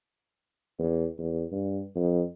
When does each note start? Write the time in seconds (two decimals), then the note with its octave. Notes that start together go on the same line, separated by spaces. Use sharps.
0.79 E2
1.19 E2
1.52 G2
1.96 F2